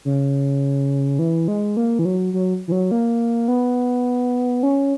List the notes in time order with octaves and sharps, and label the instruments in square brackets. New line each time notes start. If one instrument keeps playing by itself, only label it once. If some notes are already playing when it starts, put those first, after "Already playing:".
[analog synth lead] C#3
E3
G#3
A#3
E3
F#3
F#3
E3
F#3
A#3
B3
C#4